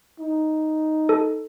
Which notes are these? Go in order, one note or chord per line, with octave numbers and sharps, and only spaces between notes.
D#4
A4